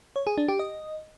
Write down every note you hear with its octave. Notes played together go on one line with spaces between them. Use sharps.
C#5
G#4
D4
G4
D#5